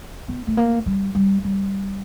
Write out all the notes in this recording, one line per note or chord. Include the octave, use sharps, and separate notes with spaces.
B3
A3
A#3
G3
G3
G3